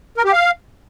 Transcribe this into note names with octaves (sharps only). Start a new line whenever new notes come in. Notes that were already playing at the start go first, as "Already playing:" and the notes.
A#4
G4
F5